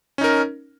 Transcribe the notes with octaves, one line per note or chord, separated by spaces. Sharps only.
C#4 D#4 A#4